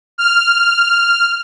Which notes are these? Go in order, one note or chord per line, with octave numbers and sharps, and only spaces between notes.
F6